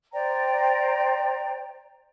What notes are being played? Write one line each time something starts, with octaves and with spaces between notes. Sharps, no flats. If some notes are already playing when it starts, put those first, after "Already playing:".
C5 D5 G5 A#5